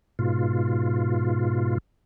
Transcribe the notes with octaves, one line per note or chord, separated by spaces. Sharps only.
G#2 B2 F4